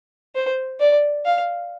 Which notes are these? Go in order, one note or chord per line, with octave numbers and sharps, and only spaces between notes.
C5
D5
F5